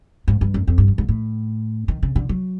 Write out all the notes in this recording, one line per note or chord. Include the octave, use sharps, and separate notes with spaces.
G#2
G2
F#2
F2
G2
F#2
G#2
A2
D#3
C#3
D3
F#3